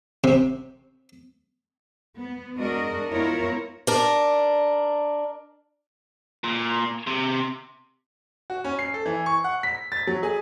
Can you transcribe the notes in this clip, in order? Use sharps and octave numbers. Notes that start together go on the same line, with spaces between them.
C3
B3
G#3 D4 F#4 A#4 D#5
B3 E4 F4 A#4 C#5
D4 A#4
A#2
C3
F#4
C#4
C7
A4
E3
C#6
F#5
B6
A6
F#3
G#4